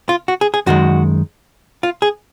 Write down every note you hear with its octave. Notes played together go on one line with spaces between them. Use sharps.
F4
F#4
G#4
G#4
F#2 D#3 G#3 F#4
F4
G#4